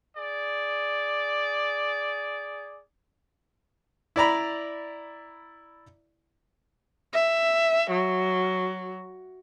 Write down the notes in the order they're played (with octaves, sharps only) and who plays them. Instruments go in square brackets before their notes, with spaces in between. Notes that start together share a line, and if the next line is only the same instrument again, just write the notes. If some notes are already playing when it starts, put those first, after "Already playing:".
[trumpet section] G#4 D5
[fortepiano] E4 D5 A#5 B5
[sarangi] E5
F#3